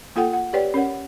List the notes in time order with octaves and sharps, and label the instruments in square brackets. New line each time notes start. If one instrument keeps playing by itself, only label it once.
[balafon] A#3 F4 A4 F#5 G5
F#5
G4 B4 C#5 D5 G5
C#4 A#4 C#5 F#5